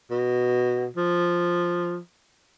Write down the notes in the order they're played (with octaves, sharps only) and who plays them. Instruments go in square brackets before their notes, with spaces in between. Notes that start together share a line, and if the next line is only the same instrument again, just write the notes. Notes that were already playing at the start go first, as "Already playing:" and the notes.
[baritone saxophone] B2
F3